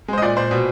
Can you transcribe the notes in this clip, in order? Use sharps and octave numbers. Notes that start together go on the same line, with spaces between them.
G#3 C5
D#5
A#2 D5
A#2 C5
B2